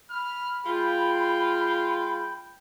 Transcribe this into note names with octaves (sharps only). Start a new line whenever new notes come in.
B5 F6
G#3 F4 G5